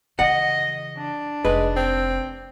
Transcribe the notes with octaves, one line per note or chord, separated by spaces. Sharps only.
C#3 E3 D#5 F#5
D4
F1 G#3 D#4 B4
C4